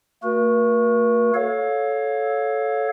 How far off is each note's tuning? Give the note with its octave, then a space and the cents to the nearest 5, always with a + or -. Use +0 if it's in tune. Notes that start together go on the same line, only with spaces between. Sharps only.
A3 +45 F#4 -10 A#4 +45
A4 -10 C#5 +0 F5 +20